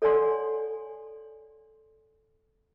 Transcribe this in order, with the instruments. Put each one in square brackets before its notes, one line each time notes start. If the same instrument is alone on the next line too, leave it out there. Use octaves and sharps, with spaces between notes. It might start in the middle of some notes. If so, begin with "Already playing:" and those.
[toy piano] A4 C#5 D5 F#5 G#5 C6